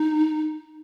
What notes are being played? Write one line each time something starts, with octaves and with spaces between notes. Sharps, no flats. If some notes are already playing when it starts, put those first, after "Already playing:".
Already playing: D#4